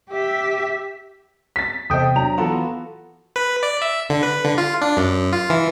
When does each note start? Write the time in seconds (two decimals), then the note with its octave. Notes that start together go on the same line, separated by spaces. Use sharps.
0.10 G4 E5
1.56 A6 B6
1.90 E2 C3 A4 C5 D#5 G5 D#6
2.16 F#3 D4 A#5 F7
2.38 E3 B3 F4 F#4 A4
3.36 B4
3.63 D5
3.82 E5
4.10 D3
4.23 B4
4.45 D3
4.58 F4
4.81 D4
4.97 F#2
5.33 F4
5.50 E3